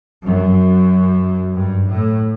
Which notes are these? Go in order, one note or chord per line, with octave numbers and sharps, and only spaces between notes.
F#2
G2
A2